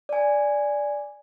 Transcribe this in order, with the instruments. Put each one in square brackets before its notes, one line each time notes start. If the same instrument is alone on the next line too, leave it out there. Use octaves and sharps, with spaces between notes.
[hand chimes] D5 G#5